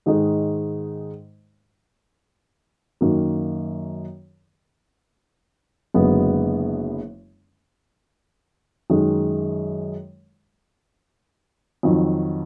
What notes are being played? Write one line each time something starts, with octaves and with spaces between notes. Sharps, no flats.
G#2 D#3 G#3 D#4
F#2 D#3 A#3
F#1 F#2 D3 G#3 B3
F#2 D#3 G#3
F2 D#3 F#3